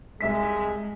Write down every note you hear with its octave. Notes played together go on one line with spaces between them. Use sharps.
C2 G#3 E5 B6